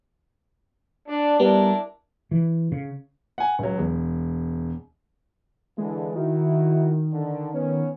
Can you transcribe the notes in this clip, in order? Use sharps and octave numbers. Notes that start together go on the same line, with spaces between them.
D4
G3 B3 D4 E4 A#4
E3
C#3
F#5 G#5
C#2 F#3
E1
D3 E3 G#3
D#3 D#4 E4 F#4
D3
B3 C#4